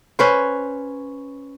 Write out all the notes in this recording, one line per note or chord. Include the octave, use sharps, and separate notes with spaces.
C#4 B4 C5